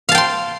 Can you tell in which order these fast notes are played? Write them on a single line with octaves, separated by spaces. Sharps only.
F5 A5 G5 C6